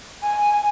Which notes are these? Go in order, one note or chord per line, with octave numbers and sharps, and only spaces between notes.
G#5